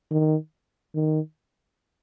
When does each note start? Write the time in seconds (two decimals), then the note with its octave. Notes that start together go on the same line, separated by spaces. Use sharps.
0.11 D#3
0.95 D#3